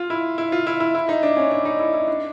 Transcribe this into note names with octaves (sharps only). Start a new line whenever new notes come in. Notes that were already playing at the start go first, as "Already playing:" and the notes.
Already playing: F4
E4
E4
F4
E4
E4
E4
D#4
D4
C#4
D4
D#4
E4
E4
D4